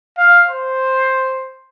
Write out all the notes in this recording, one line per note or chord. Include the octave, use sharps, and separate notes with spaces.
F5
C5